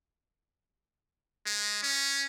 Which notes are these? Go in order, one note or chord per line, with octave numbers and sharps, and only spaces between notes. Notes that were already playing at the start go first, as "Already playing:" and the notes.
G#3
C#4